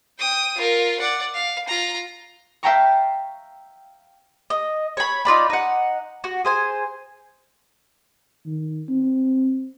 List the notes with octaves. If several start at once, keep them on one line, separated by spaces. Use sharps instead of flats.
G5 D#6
F4 A#4
D5 F#5
F5
F4 A#5
E5 F5 G5 A5 A#5 C#6
D#5
C#5 B5
D#4 F4 D5 B5
D#4 F#5
F#4
G#4 C5 G#5
D#3
C4